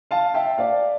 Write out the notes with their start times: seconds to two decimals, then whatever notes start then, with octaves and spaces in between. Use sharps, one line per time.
0.11 F5 A5
0.34 E5 G5
0.58 D5 F5